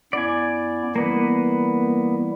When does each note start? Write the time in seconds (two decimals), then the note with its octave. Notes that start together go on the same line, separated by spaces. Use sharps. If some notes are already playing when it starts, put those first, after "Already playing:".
0.13 F#2 B3 E4 D5 G#5
0.96 E3 G3 A#3 B3 E4 B4